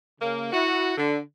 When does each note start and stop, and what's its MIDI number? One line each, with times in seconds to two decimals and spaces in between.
0.21 0.49 49
0.21 0.49 58
0.53 0.96 64
0.53 0.96 66
0.98 1.19 50